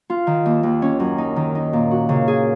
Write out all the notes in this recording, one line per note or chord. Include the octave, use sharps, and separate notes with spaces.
F4
D#3
D#2
D#2
C#4
F#2
D#4
D#3
D#4
A#2
F#4
C#3
G#4